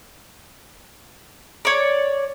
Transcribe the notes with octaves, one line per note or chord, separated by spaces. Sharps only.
C#5 D5